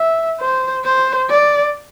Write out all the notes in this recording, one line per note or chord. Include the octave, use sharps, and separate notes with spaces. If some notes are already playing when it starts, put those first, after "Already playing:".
Already playing: E5
C5
C5
D5